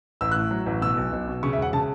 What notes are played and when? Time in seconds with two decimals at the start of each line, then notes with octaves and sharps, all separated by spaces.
0.21 A1 E6
0.31 F#6
0.36 A2
0.51 F#3
0.66 A1
0.82 B2 E6
0.96 B1
1.12 B1
1.28 B2
1.43 C#3 C#6
1.53 E5
1.58 E1 F#5
1.73 C#3 A5